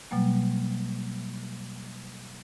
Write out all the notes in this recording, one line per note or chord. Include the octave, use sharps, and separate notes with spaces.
B2 F#3 G3 A#3